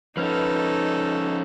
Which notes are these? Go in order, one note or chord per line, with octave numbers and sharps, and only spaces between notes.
F3 C#4 D#4 A4 B4 F6